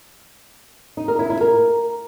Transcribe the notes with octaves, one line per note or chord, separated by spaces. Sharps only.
D#4
A#4
E4
E4
A#4